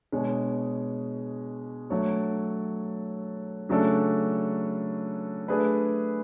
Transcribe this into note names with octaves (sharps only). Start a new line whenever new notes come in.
B2 G#3 D4 G#4 C#5
F#3 A3 D4 A4 C#5
C#3 F#3 A3 D4 A4
A3 D4 G#4 B4